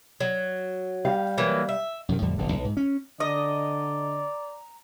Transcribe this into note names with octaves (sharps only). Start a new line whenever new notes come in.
F#3
G3 F5
E3 F#3 A#3
E5
F#2 C3 D#3
F2 A2 D3 G3
E1 A#1 G2 D3
B1
G#2
C#4
D3 D5 D#5 A#5